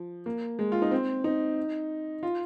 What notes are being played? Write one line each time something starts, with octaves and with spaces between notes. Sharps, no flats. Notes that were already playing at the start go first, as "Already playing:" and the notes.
Already playing: F3
A#3
G#3
F4
D#4
C4
D#4
F4